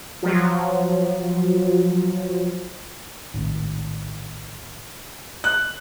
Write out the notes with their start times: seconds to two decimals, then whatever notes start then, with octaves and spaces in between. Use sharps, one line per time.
0.22 F3 F#3
3.34 A#1 A2 D#3
5.44 F#6